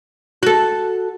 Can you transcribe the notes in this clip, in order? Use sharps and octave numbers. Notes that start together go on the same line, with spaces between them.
F#4 A4